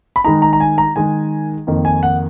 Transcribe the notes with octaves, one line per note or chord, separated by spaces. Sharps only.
B5
D#3 G#3 D#4 A#5
A#5
A#5
G#5
A#5
D#3 G#3 D#4 G#5
F2 D#3 A#3
G#5
F#5